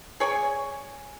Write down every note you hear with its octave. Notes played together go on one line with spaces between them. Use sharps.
G#4 C#5 D5 G#5